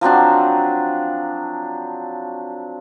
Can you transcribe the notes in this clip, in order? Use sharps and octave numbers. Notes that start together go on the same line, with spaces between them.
F3 F#3 C4 D4